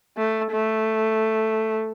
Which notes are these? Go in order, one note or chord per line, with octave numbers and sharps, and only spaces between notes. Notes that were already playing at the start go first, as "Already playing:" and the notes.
A3
A3